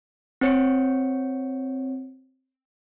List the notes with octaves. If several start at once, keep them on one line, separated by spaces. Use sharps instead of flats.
C4 C#5 C#7